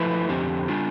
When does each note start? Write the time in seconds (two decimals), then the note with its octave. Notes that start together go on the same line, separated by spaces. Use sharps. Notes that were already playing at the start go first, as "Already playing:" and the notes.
Already playing: F3 A3 E4 B4
0.29 F2 D3 F3 C4 G4
0.68 G3 D4 F4